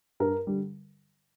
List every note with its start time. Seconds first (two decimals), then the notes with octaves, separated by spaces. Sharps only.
0.20 G2 A#4
0.47 D3 G3